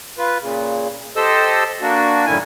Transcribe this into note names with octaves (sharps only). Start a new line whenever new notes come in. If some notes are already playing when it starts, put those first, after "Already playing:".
F4 B4
A#2 C#3
G4 A4 C5 D#5 E6
A#3 D4 F#4
F#2 A2 D3 D#3 E4 G#5